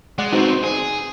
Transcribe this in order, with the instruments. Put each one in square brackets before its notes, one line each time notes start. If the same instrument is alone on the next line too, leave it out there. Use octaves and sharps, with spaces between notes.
[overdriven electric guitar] G#3 [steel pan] D5 F#5
[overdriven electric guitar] B3 C4 [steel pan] D#4 F#4 C5
[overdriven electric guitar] G#4